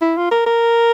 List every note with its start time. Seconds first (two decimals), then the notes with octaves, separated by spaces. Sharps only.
0.02 E4
0.17 F4
0.31 A#4
0.46 A#4